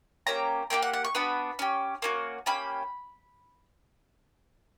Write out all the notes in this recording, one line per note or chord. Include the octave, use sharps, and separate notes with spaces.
A#3 C#4 G4 A#5
A#3 E4 G4 G5
F#5
F#5
C#6
B3 D4 F#4 B5
C#4 G4
A#3 C#4 F#4
A#3 C#4 G4 B5